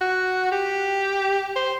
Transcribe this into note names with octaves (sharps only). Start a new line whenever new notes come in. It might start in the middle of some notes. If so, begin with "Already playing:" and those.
F#4
G4
C5